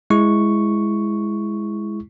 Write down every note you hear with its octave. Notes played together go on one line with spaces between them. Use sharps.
G#3 E4 C#6